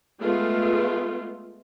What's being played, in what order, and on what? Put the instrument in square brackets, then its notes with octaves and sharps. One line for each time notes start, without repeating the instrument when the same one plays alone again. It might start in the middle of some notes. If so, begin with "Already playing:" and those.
[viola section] G#3 A3 B3 F4